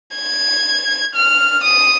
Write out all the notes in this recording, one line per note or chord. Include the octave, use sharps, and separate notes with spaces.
G#6
F6
D#6